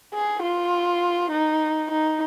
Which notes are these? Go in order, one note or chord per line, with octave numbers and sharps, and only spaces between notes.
G#4
F4
D#4
D#4